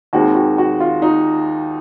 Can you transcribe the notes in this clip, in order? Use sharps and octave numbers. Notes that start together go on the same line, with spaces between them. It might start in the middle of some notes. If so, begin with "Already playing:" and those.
D#2 D#3 G#3 C4 F#4
F#4
F#4
F4
D#4